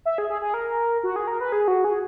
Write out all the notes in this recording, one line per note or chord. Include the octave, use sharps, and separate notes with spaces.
E5
G#4
G#4
G#4
A#4
F#4
G#4
A#4
B4
G#4
F#4
G#4